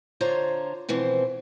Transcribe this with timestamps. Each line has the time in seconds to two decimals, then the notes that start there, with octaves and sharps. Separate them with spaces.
0.21 D3 F4 C5 C#5 A#5
0.89 B2 E3 F3 C4